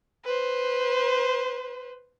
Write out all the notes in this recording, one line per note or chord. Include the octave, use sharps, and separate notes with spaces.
B4 C5